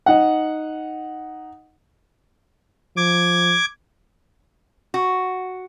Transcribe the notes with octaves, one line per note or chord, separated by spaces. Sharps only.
D#4 F#5
F3 D6 G#6
F#4